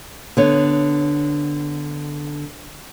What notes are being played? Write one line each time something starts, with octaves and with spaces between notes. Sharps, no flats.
D3 B3 C#5